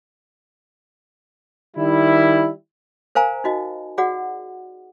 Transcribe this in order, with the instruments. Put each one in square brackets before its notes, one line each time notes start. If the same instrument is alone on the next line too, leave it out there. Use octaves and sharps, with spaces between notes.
[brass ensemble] D#3 G3 E4
[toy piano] A#4 C5 F5 G#5 A#5
D#4 F#4 D#5
F#4 G#4 D5 F#5